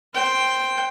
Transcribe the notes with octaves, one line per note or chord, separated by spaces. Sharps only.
C5 G5